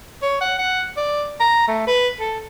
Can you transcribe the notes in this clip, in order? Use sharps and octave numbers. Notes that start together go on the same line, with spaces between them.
C#5
F#5
F#5
D5
A#5
A3
B4
A4